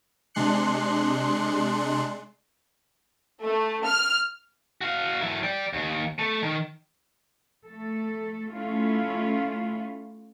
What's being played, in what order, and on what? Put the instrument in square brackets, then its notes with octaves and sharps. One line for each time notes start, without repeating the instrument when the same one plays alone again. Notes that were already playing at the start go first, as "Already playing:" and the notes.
[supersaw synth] C3 G#3 D4 C6 F#6 C#7
[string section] A3
F6
[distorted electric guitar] F#4 F5
F#3 E4
D5 G5
D#2
A3
D#3
[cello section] A3 A4
A3 C#4 E4 F4